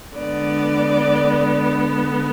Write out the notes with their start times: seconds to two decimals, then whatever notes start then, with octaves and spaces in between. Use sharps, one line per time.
0.15 D3 G#3 B3 D5